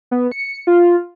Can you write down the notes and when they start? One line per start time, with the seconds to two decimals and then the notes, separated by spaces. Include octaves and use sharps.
0.11 B3
0.32 C#7
0.67 F4